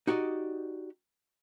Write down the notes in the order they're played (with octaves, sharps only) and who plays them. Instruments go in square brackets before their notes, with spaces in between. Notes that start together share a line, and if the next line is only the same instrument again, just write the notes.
[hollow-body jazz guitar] D#4 F#4 G4 D5 D#5